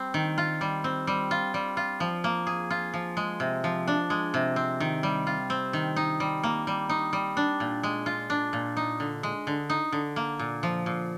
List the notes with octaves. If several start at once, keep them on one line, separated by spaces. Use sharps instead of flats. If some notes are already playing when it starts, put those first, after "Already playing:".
Already playing: G3 C4
D#3
F4
G3
C4
G3
F4
G3
F4
F3
A#3
G#4
F4
F3
G#3
C3
F3
D4
G#3
C3
C4
D#3
G3
F4
C4
D#3
D#4
G3
A#3
G3
D#4
G3
D4
A#2
G#3
F4
D4
A#2
D#4
D3
G#3
D3
D#4
D3
A#3
A#2
F3
A#2